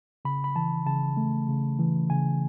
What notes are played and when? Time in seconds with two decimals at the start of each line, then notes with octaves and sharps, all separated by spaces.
0.25 C#3 B5
0.44 B5
0.56 E3 A5
0.86 C#3 A5
1.17 A3
1.49 C#3
1.79 E3
2.10 C#3 G#5